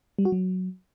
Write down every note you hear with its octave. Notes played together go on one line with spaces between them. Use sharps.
G3
F#4
F#3